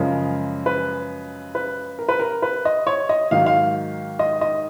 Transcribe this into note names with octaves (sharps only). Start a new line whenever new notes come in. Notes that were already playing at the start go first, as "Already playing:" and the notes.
Already playing: F#2 C#3 F3 G#3 A#4
B4
B4
A#4
B4
A#4
B4
D#5
C#5
D#5
G#2 D#3 F#3 F5
F5
D#5
D#5